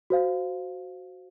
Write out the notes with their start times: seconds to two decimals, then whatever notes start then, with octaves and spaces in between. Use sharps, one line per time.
0.10 F#4 C5 F5